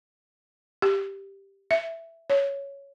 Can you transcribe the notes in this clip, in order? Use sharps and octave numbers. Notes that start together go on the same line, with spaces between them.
G4
E5
C#5